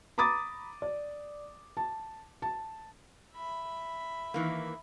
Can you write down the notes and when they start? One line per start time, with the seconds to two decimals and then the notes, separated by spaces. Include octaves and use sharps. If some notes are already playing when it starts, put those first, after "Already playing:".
0.18 A#5 B5 D6 D#6 A6
0.82 D5
1.77 A5
2.42 A5
3.34 E5 B5
4.34 D#3 E3 A#3